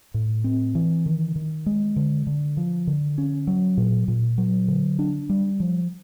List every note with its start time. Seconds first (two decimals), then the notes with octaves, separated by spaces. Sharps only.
0.14 A2
0.44 C4
0.75 E3
1.06 D#3
1.36 D#3
1.66 G#3
1.96 D3
2.27 D3
2.57 F3
2.87 D3
3.18 C#4
3.47 F#3
3.77 A#2
4.08 A#2
4.38 F#3
4.68 D3
4.99 D4
5.29 G3
5.60 F3